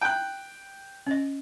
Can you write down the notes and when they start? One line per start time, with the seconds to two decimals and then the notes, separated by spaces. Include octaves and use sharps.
0.01 G5 F#6
1.07 C#4 D#5